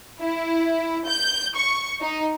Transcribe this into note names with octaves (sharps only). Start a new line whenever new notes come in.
E4
G6
C#6
D#4